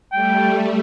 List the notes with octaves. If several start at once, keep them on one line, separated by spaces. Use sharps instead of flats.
G3 A3 G5